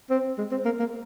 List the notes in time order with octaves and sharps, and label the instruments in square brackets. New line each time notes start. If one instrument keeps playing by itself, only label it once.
[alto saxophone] C4
G#3
C4
A#3
A#3